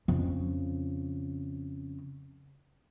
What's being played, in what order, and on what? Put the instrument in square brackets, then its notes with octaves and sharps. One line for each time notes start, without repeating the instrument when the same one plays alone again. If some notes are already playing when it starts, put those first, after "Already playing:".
[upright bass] F2 C#3